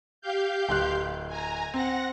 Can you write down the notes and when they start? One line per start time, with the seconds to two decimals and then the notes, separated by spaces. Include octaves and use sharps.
0.21 G4 F5 G6
0.69 D1 C6 F#6
1.28 G#5 A#5
1.74 C4 F#5 A#6